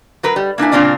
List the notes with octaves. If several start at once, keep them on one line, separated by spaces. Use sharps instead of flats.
F#3 A#4 B4
G3
A#3 D4 E4 G#5
A#2 C#3 C4 D4 F4 D5